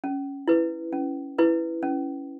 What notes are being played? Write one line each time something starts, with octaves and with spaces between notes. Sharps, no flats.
C#4
E4 B4
C#4
E4 B4
C#4